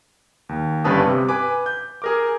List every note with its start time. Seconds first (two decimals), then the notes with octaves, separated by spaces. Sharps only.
0.49 D#2
0.84 G1 G2 C#4 B4 A5 D#6
1.06 C3
1.29 B4 G#5 D6
1.66 G6
2.02 G#4 A#4 D6